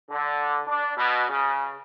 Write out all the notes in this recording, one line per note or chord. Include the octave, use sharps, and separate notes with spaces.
D3
D4
B2
C#3